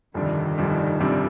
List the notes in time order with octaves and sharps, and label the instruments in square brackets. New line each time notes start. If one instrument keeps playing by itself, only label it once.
[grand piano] G1 F2 C3 G3 D4 [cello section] D#3
[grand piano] G1 F2 C3 G3 D4
G1 F2 C3 G3 D4